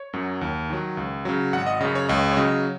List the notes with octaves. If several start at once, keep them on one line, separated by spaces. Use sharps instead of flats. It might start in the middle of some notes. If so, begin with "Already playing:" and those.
Already playing: C#5
F#2 F#3
D#2
D#3 F#3
C#2
C#3 F#3
G#1 F#5
D#5
F#2 C#3 D#5
C#5
C#2 D#5
C#5
C#3 F#3 D#5